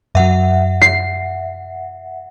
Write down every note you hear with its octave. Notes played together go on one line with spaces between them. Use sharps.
F#2 F#3 E5 F#5
C7